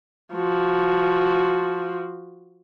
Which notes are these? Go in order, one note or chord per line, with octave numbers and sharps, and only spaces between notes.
F3 F#4